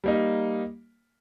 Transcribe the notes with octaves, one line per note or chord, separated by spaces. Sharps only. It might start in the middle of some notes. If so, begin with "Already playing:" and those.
G3 A#3 D#4